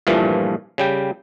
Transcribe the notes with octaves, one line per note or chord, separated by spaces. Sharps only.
G2 A#2 E3 F3 A3
C#3 G3 G5